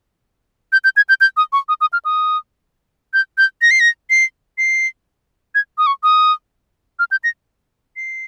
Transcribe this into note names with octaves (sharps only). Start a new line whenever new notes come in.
G6
G6
G#6
G6
G6
D#6
C#6
D#6
D#6
F6
D#6
G6
G6
A#6
C7
A#6
C7
C7
G#6
D#6
C#6
D#6
F6
G6
A#6
C7